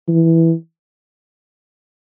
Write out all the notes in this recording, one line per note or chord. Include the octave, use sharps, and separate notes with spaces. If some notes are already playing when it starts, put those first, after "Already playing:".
E3